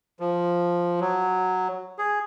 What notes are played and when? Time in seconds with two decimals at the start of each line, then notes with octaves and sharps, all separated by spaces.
0.20 F3
1.01 F#3
1.99 G#4